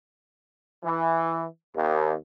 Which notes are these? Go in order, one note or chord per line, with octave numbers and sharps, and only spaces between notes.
E3
D#2